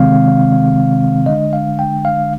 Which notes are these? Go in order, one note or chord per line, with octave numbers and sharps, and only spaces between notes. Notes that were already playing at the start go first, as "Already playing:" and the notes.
Already playing: C3 D#3 G#3 C4 F5
D3 G#3 D4 D#5
F5
G5
F5